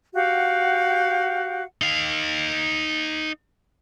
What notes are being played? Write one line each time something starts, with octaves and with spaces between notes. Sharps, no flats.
F#4 G4 F5 F#5
D#4 F5